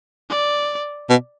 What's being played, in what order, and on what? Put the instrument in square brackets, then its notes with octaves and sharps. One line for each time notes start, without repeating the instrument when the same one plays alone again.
[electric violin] D5
[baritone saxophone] B2